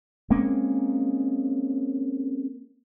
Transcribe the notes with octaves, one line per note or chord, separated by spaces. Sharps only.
G#3 A#3 C4 C#4